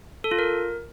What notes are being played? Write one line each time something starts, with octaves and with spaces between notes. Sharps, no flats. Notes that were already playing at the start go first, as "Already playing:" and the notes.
A4
F4
A#4